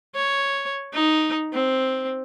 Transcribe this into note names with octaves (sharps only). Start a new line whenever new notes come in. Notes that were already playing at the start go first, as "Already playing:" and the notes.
C#5
D#4
C4